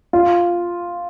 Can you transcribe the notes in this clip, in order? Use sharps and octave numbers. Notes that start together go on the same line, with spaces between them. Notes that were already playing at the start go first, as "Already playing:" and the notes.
F4